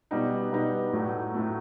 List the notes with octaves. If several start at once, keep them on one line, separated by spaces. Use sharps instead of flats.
B2 G3 B3 D#4
B2 G3 B3 D#4
A2 F#3 A3
A2 F#3 A3